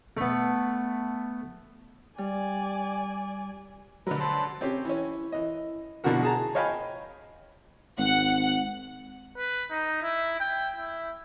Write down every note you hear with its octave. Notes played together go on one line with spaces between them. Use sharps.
A3 B3
G3 D5 G#5
D3 F#3 A#4 B4
C5 A5 B5
C4 C#4 G4
E3 C#4
E3 D#5
B2 D3 E3 F3 F#4 A#4
G#4 A5 A#5
C#5 D#5 F5 G5 G#5 B5
G#1 F#5
B4
D#4
E4
G5
E4